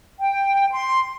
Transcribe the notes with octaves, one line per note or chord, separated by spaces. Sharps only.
G5
C6